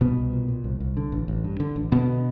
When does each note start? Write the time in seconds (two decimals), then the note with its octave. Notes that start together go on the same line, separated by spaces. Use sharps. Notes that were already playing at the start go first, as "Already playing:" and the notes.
0.01 C2 B2 B3
0.17 C2
0.33 A#2
0.48 A#2
0.64 C2
0.80 C2
0.97 D3
1.12 A1
1.28 A1
1.44 G2
1.60 D3
1.76 A1
1.92 B2 D3 B3